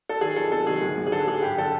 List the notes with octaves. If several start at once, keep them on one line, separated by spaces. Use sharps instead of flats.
A4
D#3 G#4
F2 A4
C3 A4
D#3 G#4
D2
D2
G#4
D3 A4
D2 G#4
G2 G4
D3 A4